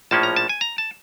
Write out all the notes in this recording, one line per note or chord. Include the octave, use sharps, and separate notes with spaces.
A#1 A2 F3 A#3 C#4 A5
A#5
A5
G#5
A#5
A5